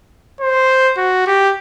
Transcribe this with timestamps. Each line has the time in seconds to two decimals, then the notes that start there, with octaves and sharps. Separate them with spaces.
0.41 C5
0.97 F#4
1.27 G4